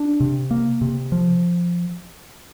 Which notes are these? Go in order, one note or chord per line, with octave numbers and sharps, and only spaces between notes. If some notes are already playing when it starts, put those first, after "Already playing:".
Already playing: D4
C3
A#3
C3
F3